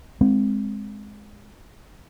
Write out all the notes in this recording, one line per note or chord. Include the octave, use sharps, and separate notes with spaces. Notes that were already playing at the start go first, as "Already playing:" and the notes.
G#3 C4